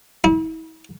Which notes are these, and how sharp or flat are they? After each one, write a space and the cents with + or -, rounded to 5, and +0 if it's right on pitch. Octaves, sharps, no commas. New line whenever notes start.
E4 -40